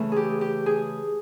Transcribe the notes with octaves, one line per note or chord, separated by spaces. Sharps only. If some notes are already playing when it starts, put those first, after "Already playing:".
Already playing: C#3 E3 A3
G4 G#4
G4
G#4